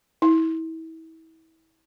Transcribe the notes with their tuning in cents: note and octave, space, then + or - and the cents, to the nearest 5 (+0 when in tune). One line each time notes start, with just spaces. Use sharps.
E4 -30